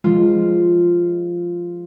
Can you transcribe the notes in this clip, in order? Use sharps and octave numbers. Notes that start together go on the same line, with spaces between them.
F3 G#3 F4